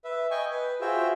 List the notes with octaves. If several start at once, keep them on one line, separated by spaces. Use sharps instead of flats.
B4 E5
D#5 G5 G#5 C#6
B4
F4 F#4 G#4 C5 E5 G5